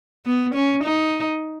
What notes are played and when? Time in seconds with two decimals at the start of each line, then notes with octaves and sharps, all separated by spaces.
0.26 B3
0.55 C#4
0.84 D#4